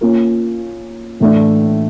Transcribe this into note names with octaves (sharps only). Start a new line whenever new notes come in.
A#3 C#4 F4 A#4
A2 E3 A3 D4